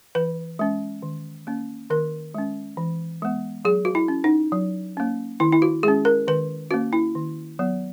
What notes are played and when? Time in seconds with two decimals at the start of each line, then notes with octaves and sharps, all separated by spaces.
0.15 E3 B4
0.59 G#3 C#4
1.02 D#3
1.47 A#3 C#4
1.90 D#3 A#4
2.35 G#3 C#4
2.77 E3
3.22 G#3 B3
3.65 F#3 G#4
3.85 F#4
3.95 E4
4.08 C#4
4.24 D#4
4.52 F#3
4.97 A#3 C#4
5.40 D#3 E4
5.52 E4
5.62 F#4
5.83 G#3 C#4 G#4
6.05 A#4
6.28 D#3 B4
6.71 A#3 C#4 F#4
6.93 E4
7.15 D#3
7.59 F#3 B3